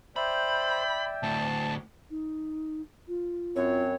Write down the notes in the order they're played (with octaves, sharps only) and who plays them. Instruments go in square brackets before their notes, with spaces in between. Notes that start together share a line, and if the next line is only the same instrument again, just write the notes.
[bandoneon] C5 [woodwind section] D5 E5 G5 [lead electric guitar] B5
[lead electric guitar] D2 A2 [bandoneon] A5
[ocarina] D#4
F4
[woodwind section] F#2 C4 [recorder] C#5